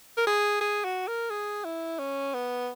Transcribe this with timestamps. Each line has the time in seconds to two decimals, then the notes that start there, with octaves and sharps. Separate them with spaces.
0.17 A#4
0.27 G#4
0.61 G#4
0.84 F#4
1.07 A#4
1.30 G#4
1.64 E4
1.99 C#4
2.34 B3